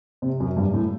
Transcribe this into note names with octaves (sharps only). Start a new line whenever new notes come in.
C3
F#2
G2
A2